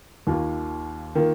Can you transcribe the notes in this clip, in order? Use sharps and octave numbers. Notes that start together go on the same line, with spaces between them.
D#2 D#3 A#3 F4
D#3 A#3 F4